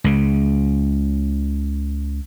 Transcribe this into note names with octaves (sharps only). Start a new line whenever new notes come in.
C#2 C#3